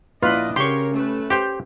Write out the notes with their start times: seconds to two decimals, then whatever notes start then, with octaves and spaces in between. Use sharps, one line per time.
0.23 A#1 D4 E4 F4 B4 D5 D#5 F5
0.56 C#3 G4 A#4 C#5 C6 C#6
0.91 A3 C#4 B4
1.30 G4 C5 G5